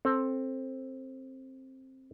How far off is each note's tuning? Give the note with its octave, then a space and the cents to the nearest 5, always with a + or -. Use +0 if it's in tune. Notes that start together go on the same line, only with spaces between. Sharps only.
C4 +10 A4 +0